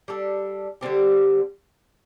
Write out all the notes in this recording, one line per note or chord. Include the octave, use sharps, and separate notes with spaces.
G3 D4 A4
D3 G3 C4 G4